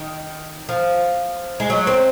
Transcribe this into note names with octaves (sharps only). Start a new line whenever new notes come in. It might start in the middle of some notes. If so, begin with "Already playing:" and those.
Already playing: D#3
F3
G#3
F#3
C4